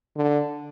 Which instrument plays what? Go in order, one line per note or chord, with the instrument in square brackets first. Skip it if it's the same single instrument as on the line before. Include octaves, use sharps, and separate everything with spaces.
[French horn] D3